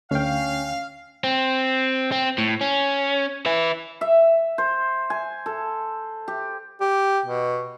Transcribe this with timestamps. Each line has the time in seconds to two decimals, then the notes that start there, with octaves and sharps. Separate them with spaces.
0.11 D2 C#4 F5 G5
1.24 C4
2.12 C4
2.38 A2
2.61 C#4
3.46 B4 E5
4.01 E5
4.58 C5
5.10 G#5
5.46 A4
6.28 G4
6.81 G4
7.26 B2